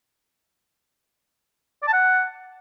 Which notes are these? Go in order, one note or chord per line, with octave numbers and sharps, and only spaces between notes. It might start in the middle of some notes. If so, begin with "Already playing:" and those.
D5
A5
F#5